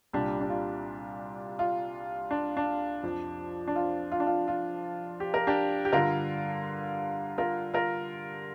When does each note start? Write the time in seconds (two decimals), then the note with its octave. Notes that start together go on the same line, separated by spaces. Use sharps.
0.13 C2 A#2 G3 D4 G4
0.41 D4
0.50 F4
1.59 F4
2.31 D4
2.57 D4
3.03 F2 F3
3.68 D4
3.76 F4
4.12 F4
4.20 D4
4.27 F4
4.48 F4
5.20 G4
5.34 A#4
5.47 D4 G4
5.85 G4
5.93 G2 D3 G3 F4 A#4
7.38 F4 A#4
7.74 F4 A#4